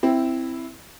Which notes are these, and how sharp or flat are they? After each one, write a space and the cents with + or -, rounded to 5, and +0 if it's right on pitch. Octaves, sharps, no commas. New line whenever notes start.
C4 +0 E4 +0